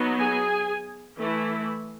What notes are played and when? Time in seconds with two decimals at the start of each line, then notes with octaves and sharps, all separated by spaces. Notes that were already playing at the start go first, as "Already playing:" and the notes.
Already playing: F#3 B3 D#4
0.19 G#4 G#5
1.18 E3 A3 E4